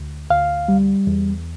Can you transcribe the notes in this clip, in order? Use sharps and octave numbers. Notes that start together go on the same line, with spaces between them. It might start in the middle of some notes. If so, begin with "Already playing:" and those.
Already playing: D2
D2 F5
G3
E2